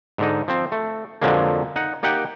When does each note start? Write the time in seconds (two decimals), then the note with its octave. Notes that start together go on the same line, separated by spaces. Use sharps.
0.18 G#2 D3 D#4
0.48 F3 C4
0.72 A3
1.22 F2 D3 F3 F#3 G#3 A#3
1.76 D#4 F#5
2.03 A#3 D#4 G4 F#5 G5